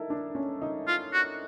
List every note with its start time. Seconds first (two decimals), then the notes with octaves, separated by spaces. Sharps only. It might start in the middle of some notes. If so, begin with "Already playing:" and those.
Already playing: D#4 E4 A4 A#4
0.10 D4
0.35 C#4
0.62 D#4
0.87 F4
1.13 F#4